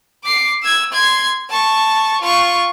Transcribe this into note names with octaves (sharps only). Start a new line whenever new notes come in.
D6 C7
E6 G#6
C6 G#6
A5 C#6
F4 C#6